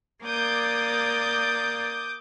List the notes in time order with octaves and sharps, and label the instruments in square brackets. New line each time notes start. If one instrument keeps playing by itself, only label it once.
[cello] A#3 D5 [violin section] D6 D#6 G6